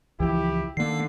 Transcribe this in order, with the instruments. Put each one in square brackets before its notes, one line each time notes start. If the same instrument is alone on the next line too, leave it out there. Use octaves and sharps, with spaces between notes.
[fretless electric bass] C#2 E3 F3 [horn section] E4 G4
[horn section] D3 [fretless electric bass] D#3 [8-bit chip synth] A#3 C7